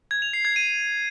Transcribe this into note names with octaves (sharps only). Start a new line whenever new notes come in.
G#6
F7
C7
G#6
D#7